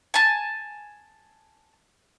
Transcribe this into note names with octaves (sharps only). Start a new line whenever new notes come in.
G#5 A5